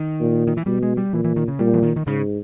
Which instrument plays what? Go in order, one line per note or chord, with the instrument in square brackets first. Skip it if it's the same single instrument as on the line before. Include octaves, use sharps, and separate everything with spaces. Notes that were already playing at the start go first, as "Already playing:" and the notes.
Already playing: [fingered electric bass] D#3
[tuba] A#2
[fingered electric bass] D#3
E3
[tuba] B2 [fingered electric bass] G3
[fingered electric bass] G#3
G3
[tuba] A#2 [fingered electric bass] E3
[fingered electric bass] E3
D#3
C#3
[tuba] A#2 [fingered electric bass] G3
[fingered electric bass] E3
D#3
D#3
[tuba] G#2 [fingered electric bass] C#3